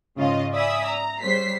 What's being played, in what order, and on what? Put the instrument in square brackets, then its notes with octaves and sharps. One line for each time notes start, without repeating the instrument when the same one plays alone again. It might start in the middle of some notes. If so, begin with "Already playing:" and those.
[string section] G#2 C#3 F4 D#5
D5 E5 G#5 B5 D#6 E6
A#5
C#3 G3 C5 B6 C7